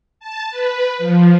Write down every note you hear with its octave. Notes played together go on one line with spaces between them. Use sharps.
A5
B4
F3